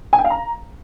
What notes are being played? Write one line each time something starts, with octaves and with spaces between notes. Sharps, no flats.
G#5
G5
F5
A#5